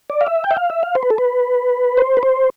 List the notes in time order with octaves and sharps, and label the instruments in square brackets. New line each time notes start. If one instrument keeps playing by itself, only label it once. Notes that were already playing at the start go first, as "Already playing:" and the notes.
[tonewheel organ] D5
F5
E5
G5
E5
F5
E5
F5
C5
B4
A4
B4
C5
B4
C5